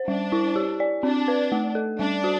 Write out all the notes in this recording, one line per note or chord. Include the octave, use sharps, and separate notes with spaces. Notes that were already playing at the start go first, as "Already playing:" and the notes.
Already playing: C5
G3 D4
E4
G4
D5
C4 D4
B4
A3
A4
G3 D4
F#4